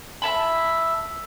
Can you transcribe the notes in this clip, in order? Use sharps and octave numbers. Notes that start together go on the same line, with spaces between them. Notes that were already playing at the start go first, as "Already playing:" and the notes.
E5 A5 B5